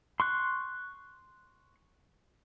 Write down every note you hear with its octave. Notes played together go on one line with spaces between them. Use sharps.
C6 C#6 F#6